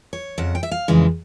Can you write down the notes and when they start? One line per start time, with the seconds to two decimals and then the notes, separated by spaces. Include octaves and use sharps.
0.13 C#5
0.38 F2 C#3 F#5
0.55 G5
0.63 E5
0.71 F5
0.88 F2 C#3 E3 G#3